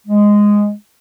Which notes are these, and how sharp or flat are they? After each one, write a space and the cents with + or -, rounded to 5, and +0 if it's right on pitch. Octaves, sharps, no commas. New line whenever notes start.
G#3 -5